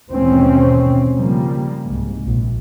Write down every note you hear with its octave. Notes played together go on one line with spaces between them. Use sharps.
D#2 G#2 B2 E3 C4 C#4
C#3 F3 G3 A#3
C2 G#2
A#1